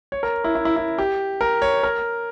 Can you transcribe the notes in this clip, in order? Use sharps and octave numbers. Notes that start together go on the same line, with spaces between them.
C#5
A#4
E4
E4
E4
E4
G4
A#4
C#5
A#4